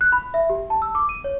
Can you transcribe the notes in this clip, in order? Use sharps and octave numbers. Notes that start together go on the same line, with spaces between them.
F#6
B5
E5
G4
A5
E6
D6
D#7
C#5